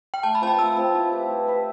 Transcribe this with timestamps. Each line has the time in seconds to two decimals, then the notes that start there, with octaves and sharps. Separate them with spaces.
0.14 G5
0.23 A3 A5
0.35 B5
0.41 C4 F4 C5 A5
0.47 B5
0.59 A3 E6
0.77 C4 F4 C5
0.94 E4
1.12 G4 B4 E5
1.30 E4
1.47 G4 B4 E5